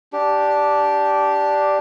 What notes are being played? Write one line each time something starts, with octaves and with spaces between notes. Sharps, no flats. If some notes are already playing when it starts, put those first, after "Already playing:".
D4 G4